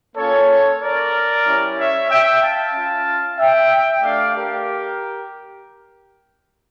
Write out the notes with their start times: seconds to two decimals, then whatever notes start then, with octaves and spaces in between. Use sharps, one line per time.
0.16 A#3 C#4 F4 A4 C#5
0.81 A#4 D5
1.45 G3 C#4 E4 G4
1.77 C#5 E5
2.09 E5 G5
2.41 F5 A5
2.74 C#4 F4
3.38 E5 G5
4.02 A3 D4 G4 D5 F5
4.35 G4 A#4